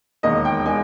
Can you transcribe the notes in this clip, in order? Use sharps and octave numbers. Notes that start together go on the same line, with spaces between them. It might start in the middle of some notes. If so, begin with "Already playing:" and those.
E1 D#2 D#3 G#3 D#5
G5
D#3 G#3 G#5